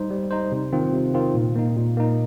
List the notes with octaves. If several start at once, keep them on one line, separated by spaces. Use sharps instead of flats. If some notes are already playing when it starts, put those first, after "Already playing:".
Already playing: G3 D#4 C5
G3
D#4 C5
C3
D#3 C4 F4
C3
D#3 C4 F4
A#2
A#3 D#4
A#2
A#3 D#4